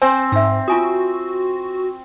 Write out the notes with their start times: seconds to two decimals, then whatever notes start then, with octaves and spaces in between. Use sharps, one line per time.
0.02 C4 C5 G#5 C6
0.32 G#2 E5 E6
0.68 F4 F#4 G#5 D#6